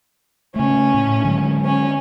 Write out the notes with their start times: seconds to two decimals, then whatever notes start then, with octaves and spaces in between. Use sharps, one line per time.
0.56 C#3 A3 C#4
0.94 A2
1.25 D3 F#3 G#3
1.64 C#4